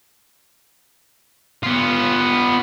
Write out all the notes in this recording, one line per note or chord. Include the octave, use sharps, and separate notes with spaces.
B3 F4